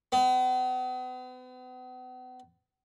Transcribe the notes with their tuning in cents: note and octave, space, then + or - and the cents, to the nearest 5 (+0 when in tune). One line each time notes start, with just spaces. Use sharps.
B3 +40